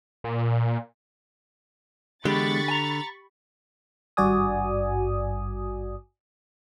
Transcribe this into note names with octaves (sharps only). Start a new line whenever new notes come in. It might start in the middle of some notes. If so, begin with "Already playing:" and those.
A#2
E2 G2 D3 G#3 G4 B5 C#6 A6
G#5 A#5
G#1 G2 F#4 D5 G#5 D#6